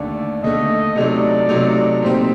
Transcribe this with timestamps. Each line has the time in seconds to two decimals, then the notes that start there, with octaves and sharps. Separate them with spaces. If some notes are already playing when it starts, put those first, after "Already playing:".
Already playing: D#2 D3 A3 D5
0.42 D#2 D3 A3 D#5
0.95 C3 F#3 A3 D#4 D5
1.49 C3 F#3 A3 D#4
2.02 A#2 G3 C4 D#4 C5